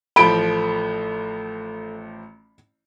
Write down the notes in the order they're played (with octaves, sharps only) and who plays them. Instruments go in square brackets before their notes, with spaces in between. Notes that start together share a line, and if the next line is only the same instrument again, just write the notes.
[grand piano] A1 F3 G7 [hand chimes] A4 [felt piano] B5 D7